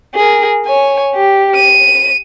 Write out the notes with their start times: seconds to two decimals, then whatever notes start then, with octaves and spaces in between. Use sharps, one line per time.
0.15 G#4 A#4
0.66 C#5 G#5
1.15 G4
1.56 D#7